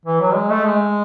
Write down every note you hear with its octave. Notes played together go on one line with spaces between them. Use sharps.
E3
F#3
G#3
A3
G#3